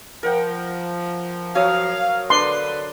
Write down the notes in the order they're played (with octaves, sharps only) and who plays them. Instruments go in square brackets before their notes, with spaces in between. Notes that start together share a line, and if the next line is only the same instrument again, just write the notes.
[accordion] F3 [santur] A#4 F#5 G5
[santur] F#3 C#5 D#6 [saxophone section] F5
[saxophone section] D3 B4 [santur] D4 [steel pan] C6